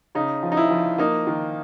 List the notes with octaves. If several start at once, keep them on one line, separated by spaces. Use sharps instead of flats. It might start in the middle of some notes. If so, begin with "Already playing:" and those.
C#3 D#4
F3
D#4
E4
F3
A#3 D#4
D#3